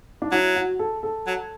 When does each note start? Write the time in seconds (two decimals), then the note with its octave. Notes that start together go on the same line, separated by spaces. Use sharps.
0.22 D4
0.31 F#3 E4
0.56 F#4
0.79 A4
1.03 A4
1.27 F#3